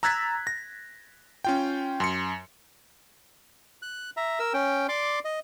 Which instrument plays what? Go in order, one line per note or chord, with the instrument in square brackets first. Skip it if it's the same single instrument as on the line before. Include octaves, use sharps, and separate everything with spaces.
[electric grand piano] A#5 E6 F#6 G#6 A6 B6
A#6
C#4 F4 G5
F#2 C6 C#7
[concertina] F#6
E5 A#5
A#4 E6
C#4 G5
D5 C6 D6
D#5